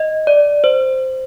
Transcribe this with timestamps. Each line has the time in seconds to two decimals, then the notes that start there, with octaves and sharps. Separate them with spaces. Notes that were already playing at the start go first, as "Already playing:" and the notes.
Already playing: D#5
0.27 D5
0.64 C5